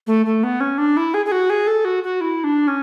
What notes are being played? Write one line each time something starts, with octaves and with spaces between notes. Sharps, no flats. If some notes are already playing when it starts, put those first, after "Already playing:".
A3
A3
B3
C#4
D4
E4
G#4
G#4
F#4
G#4
A4
F#4
F#4
E4
D4
C#4